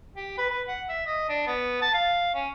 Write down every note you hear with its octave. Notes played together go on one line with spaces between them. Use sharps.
G4
B4
B4
F#5
E5
D#5
D4
B3
A5
F5
C#4